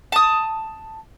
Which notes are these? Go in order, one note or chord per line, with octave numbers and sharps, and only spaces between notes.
A5 D#6